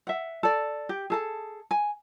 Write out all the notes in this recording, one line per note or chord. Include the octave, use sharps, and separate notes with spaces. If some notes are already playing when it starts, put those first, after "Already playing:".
E5 F#5
A4 D5
G4
G#4 A4 A5
G#5